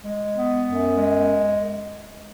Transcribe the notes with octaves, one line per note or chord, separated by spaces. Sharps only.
G#3
B3
F#2
G#3